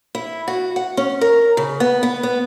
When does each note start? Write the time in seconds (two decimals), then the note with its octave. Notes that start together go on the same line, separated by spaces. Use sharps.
0.15 E4
0.48 F#4
0.76 F#5
0.97 C#4
1.21 A#4
1.57 C#3
1.80 B3
2.03 B3
2.23 B3